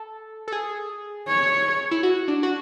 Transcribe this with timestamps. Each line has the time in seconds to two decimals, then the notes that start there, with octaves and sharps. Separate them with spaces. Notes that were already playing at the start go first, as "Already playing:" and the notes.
Already playing: A4
0.48 A4
0.52 G#4
1.28 C#5
1.91 E4
2.03 F#4
2.28 D4
2.43 F#4